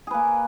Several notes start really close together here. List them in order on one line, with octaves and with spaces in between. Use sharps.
G#4 B4 A#3